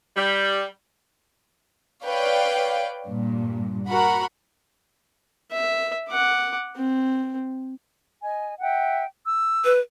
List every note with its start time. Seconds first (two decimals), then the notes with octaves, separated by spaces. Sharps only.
0.15 G3
2.04 B4 C#5 D5 F5 G5
3.08 G2 A#2
3.88 F#4 A#4 F#5 B5
5.51 E5
6.10 F#5 D6
6.76 C4
8.22 D#5 G#5
8.61 E5 F#5 G5
9.25 E6
9.64 B4